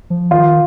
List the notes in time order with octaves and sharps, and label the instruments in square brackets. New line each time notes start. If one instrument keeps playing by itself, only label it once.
[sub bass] F3
[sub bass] D#3 [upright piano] F4